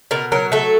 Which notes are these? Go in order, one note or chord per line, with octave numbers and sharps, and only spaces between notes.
B2 A#4
F#3 A#4
A3 A4